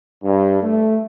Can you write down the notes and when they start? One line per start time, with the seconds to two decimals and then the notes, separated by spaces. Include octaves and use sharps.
0.23 G2
0.62 A3